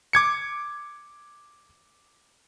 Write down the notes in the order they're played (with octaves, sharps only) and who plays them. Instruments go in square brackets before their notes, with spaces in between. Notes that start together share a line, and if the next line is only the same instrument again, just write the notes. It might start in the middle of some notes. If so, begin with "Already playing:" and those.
[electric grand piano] D6 G#6 C#7